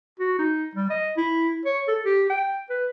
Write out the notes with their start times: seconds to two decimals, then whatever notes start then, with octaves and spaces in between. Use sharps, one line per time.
0.20 F#4
0.39 D#4
0.76 G3
0.90 D#5
1.17 E4
1.66 C#5
1.88 A4
2.05 G4
2.30 G5
2.70 B4